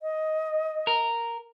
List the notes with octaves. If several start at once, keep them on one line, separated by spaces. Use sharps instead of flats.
D#5
A#4